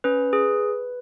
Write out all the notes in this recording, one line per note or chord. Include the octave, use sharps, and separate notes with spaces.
C#4 B4
G#4